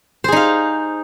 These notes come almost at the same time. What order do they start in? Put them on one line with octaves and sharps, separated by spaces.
C5 G#4 D#4 F5